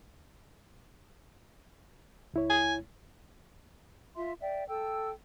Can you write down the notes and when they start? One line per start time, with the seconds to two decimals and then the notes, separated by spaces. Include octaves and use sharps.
2.34 C#2 E4 C#5
2.50 G#5
4.16 F4 E5 C6
4.41 D5 E5 G5
4.68 A4 G5 E6